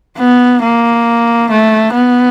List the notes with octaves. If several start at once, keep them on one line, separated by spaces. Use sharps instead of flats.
B3
A#3
A3
B3